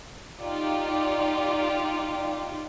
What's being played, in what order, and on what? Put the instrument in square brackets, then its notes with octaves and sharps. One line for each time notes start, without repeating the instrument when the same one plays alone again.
[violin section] D#4 F4 G4 D5